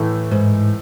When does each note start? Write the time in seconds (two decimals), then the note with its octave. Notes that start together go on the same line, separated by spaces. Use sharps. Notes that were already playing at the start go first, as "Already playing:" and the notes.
Already playing: A2 E3 A3
0.31 G#2